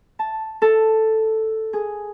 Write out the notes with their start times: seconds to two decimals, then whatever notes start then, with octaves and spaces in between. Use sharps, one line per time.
0.19 A5
0.62 A4
1.73 G#4